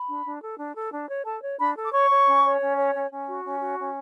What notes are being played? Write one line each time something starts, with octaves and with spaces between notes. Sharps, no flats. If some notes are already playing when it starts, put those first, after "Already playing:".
Already playing: B5
D4
D4
A4
D4
A4
D4
C#5
A4 A5
C#5
D4 B5
A4
D6
C#5 C#6
C#5
C#4
C#5
C#4
C#5
C#4
C#4
F#4
C#4
F#4
C#4